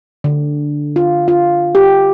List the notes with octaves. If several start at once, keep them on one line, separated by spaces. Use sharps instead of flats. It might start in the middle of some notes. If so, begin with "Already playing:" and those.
D3
F4
F4
G4